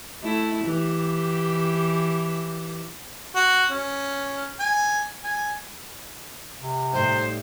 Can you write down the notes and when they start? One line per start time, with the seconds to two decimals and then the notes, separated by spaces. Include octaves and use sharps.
0.24 A3 E4
0.64 E3 G4
3.35 F#4
3.71 C#4
4.60 G#5
5.24 G#5
6.60 C3
6.93 A2 G3 D#4 C5